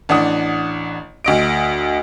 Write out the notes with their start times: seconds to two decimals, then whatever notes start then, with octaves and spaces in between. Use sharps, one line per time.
0.09 A1 D4 F#5 D#6
1.24 D2 D#5 D7